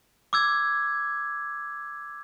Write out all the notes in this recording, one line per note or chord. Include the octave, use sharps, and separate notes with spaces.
D6 E6 G#6